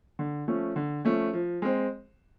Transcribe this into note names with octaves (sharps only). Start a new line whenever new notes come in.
D3
F3 A3 C#4
D3
F3 A3 C#4
F3
G#3 C4